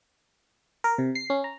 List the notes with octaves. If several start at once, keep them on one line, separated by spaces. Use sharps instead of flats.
A#4
C3
C7
C#4
A#5